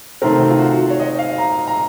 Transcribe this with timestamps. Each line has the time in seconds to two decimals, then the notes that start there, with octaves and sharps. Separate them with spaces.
0.22 C3 D#3 A3 C4 A#4
0.41 F#4
0.50 F4
0.59 F#4
0.90 C#5
0.99 D#5
1.19 F5
1.38 A#5
1.68 A#5